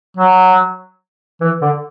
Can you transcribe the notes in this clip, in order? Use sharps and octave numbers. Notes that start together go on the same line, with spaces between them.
F#3
E3
D3